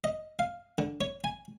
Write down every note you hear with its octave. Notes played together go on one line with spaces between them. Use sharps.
D#5
F5
D3
C#5
G#5